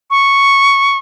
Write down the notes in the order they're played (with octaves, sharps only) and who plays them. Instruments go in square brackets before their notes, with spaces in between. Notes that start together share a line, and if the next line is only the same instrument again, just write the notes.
[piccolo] C#6